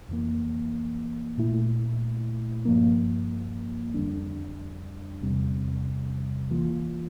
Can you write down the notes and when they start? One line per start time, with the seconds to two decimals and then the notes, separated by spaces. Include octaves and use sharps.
0.09 F2 E3 A#3
1.38 A#2 A3 E4
2.65 G2 F3 A#3
3.94 F2 D3 G3 D4
5.21 E2 C3 G3
6.50 E3 A#3 F4